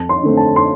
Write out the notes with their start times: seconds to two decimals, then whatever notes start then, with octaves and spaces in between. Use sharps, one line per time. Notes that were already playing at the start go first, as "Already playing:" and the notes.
Already playing: F2 A5
0.09 C6
0.23 D3 A3 C4
0.37 A5
0.56 C6